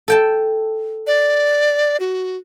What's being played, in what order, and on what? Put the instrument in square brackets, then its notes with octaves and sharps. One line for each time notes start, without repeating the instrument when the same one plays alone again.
[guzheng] A4 G5 A5
[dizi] D5
F#4